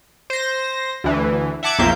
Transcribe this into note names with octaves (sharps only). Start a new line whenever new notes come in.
C5 A#6
D2 E3
E5 F#5 A5 D6 G#6
B1 F2 A#3 E5 G6